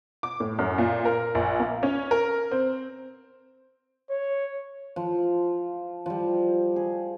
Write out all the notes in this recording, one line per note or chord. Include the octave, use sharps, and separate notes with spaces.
D6
A2
F#2
A#2
A#4
A#1
A#3
C#4
A#4
C4
C#5
F3
F3 G3
G#4